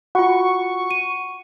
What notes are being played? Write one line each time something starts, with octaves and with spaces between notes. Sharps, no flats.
F4 F#4 F#5 C#6
D#7